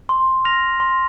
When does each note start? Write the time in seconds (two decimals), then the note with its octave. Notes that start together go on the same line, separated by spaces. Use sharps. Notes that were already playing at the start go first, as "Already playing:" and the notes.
0.09 C6
0.45 F6 A#6 F7
0.80 C6